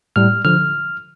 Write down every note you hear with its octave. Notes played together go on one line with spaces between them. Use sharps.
A2 G3 F6
D3 F3 F6